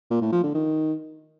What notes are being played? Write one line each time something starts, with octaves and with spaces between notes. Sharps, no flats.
A#2
A2
F3
D3
D#3